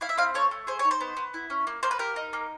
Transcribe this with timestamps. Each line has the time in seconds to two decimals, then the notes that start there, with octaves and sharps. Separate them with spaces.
0.01 E4 F5
0.09 E5
0.18 C4 F5
0.34 A4 C#5
0.51 A3
0.67 G#4 C5
0.79 C#5
0.85 D#4
0.91 C5
1.01 B3
1.17 B3
1.34 E4
1.50 C#4
1.67 A#3
1.83 A#3 C5
1.91 B4
1.99 G4 A#4
2.16 D#4
2.33 A#3